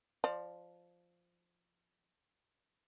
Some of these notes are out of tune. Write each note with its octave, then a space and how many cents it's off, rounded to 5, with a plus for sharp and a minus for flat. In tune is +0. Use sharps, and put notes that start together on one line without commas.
F3 +0 D5 +20